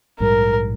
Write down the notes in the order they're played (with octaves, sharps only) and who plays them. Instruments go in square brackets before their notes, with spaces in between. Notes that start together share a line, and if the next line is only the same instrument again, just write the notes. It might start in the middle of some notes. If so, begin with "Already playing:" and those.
[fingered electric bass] A#1 G#2 G3 [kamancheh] A#4